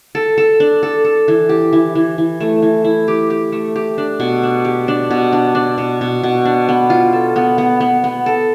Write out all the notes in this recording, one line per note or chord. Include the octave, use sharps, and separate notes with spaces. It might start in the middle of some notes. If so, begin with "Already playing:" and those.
A4
A4
D4
A4
A4
E3
G4
E3
E3
E3
A3
E3
E4
G4
G4
A3
G4
D4
B2
D4
G4
D4
B2
D4
D4
B2
B2
B2
D4
B3
F4
A4
B3
B3
B3
B3
A4